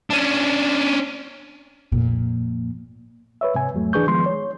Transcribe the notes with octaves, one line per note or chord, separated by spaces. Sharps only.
C#4 D4
F2 A#2
B4 C#5 E5
G#2 C3 G#5
E2 G#2 F#3 A3
E3 D4 G#4 B4 C#6 G6
D#3 F3 G#3 B3 C6
C#5